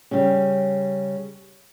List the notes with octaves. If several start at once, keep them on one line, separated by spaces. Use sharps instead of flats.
C#3 G3